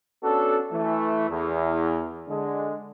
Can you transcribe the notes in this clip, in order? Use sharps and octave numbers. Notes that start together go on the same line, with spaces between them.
B3 C#4 D4 F#4 A4
E3 A3
E2
D3 G#3